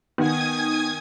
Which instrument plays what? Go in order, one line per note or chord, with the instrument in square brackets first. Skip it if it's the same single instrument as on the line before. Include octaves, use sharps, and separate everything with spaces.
[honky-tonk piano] D#3 [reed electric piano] B3 [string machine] G#5 D#6 G#6